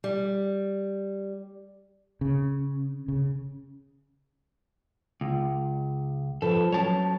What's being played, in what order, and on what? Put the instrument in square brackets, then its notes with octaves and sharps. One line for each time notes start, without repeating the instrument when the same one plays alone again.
[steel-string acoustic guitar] G3
[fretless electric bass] C#3
C#3
[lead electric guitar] C#2
[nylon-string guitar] F3 B4 [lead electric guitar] A4
[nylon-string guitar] F#3 C#4 [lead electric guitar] C#5 A5